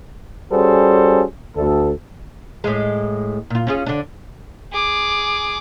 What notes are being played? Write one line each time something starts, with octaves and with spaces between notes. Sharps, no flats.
G3 C#4 F#4 G#4 A4 C5
D2 A4
A2 G#3
A#2 F4
C#4 F4 G#4
D3 D4
G#4 D6